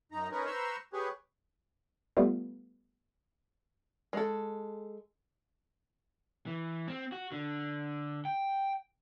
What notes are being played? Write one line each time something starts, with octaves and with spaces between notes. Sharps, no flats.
F#2 D#4 A#5
C#4 D#4 A#4 B4 C#5
B4 C5 A#5 C6 C#6 E6
G4 G#4 B4 C#5
G3 A3 B3 F4
G#3 A4
E3
C4
F#4
D3
G5